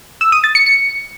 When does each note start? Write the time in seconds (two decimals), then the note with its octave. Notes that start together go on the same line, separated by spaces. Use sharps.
0.21 E6
0.32 D#6
0.44 A6
0.55 C#7
0.66 C#7